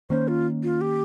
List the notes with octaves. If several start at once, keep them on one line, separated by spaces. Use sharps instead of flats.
D#3 A#3 C#4 C5
F4
F4
G4